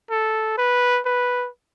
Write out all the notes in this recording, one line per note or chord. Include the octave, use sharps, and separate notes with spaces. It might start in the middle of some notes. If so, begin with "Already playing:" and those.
A4
B4
B4